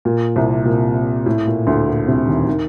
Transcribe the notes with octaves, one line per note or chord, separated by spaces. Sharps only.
A#2
C2 C3
A#2
A2
A#2
D2 D3
A#2
C2 C3
D#2 D#3
D#3